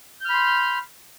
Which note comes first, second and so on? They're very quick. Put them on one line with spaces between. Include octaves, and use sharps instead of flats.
G6 F6 B5 C6